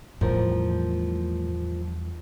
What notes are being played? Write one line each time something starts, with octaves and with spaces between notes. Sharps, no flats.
E2 A2 F3 G3 A#4